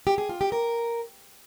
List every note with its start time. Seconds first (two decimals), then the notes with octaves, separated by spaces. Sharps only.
0.07 G4
0.18 G#4
0.29 F4
0.41 G4
0.52 A#4